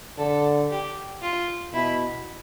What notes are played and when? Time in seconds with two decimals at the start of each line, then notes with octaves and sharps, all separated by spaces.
0.18 D3 A4
0.71 G4
1.22 F4
1.73 B2 E4